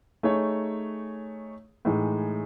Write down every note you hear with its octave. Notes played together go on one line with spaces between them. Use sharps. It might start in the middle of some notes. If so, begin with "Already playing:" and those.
A3 D#4 G#4 C#5
A2 E3 G#3 D#4